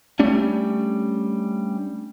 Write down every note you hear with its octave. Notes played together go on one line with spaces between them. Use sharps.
G3 A3 C#4 D4